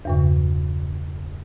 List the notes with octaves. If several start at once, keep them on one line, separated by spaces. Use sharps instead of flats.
E2 G2 C#3